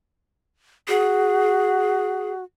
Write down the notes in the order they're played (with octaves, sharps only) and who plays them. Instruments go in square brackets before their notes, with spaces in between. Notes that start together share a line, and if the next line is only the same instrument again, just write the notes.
[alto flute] F#4 [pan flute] G#4